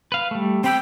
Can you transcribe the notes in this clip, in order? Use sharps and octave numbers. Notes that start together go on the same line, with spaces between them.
B4 F5
G3 A3
C4 G5 B5 E6